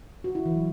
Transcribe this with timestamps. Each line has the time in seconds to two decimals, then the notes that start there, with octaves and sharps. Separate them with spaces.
0.24 F#4
0.35 E4
0.45 E3
0.56 F#3